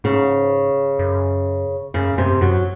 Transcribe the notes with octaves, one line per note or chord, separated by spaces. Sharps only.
G#2 C#3
F#2
F#2 C#3
F#2 C3
F#2 F#3